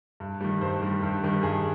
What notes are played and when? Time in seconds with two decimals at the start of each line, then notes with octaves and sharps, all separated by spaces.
0.20 G2
0.40 D#3 G3
0.61 G2 C5
0.81 D#3 G3
1.03 G2
1.23 D#3 G3
1.43 G2 G#4